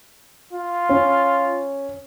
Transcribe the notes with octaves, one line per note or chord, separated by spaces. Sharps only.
F4
C#4